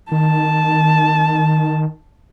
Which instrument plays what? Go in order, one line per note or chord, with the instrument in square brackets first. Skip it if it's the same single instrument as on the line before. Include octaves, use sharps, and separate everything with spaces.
[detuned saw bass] D#3 [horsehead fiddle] A5